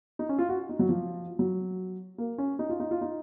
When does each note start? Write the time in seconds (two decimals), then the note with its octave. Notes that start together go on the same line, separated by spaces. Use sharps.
0.19 D#4
0.29 C#4
0.38 F4
0.49 F#4
0.69 D#4
0.79 F#3
0.89 F3
1.39 F#3
2.18 A#3
2.38 C#4
2.59 D#4
2.69 F4
2.80 D#4
2.91 F4
3.01 D#4